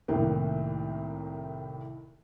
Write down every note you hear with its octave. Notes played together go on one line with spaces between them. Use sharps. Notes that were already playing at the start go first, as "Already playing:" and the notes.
C2 A2 D#3 A#3